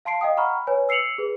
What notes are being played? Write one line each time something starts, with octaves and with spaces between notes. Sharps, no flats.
F5 A5 C6 C7 D7
D#5 F5 G5 D#6
F#5 A#5 B5 C#6 F6
B4 C#5 G#5
E6 C7 C#7 F7 F#7
G#4 B4